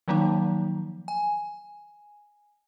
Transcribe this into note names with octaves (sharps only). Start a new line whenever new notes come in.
D#3 F3 F#3 A#3 D#4
G#5